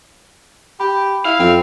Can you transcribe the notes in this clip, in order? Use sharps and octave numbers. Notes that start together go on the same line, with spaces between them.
G4 B5
E4 F5
F2 C4